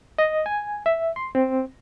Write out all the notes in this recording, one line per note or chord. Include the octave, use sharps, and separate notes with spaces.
D#5
G#5
E5
C6
C4